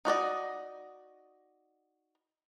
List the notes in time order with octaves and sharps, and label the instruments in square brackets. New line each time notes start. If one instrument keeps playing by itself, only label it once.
[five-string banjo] D#4 F#4 D5 D#5